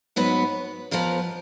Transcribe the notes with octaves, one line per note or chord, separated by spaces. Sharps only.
G#2 F#3 B3 B4
F2 F3 B3 A#4